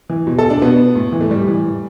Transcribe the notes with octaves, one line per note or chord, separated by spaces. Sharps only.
E3
B2
A4
D4
B2 B3
A2
E3
A3
A2 G3
E3
A2